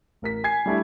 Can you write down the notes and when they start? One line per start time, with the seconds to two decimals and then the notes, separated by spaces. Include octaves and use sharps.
0.22 A1 A#4 B6
0.44 G#5 G#6 C7
0.66 G3 A3 D4 E4